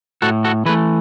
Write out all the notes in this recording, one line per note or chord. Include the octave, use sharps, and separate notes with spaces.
A2 F#4 A4
F#4 A4
E3 A3 G#4 B4